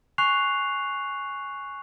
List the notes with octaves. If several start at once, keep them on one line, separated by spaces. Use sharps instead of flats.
G#5 C#6 F#6 C7 F7